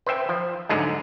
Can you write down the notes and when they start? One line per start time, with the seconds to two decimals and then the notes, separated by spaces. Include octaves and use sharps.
0.07 B4 C5 E5 G5
0.29 F3
0.69 D2 G#2 D3 F#3 G#3